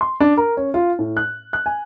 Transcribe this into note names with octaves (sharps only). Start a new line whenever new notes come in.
C6
D4
A#4
C#4
F4
A2
F#6
F#6
G#5